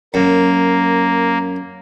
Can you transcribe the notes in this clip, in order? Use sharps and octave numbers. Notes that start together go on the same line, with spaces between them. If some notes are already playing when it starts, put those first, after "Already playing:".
F#2 A#3